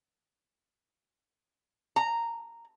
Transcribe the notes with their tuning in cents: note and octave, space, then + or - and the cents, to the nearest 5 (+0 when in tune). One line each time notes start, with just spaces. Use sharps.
A#5 -10